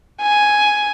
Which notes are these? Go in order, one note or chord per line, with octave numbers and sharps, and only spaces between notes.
G#5